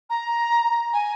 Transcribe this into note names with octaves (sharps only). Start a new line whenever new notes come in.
A#5
G#5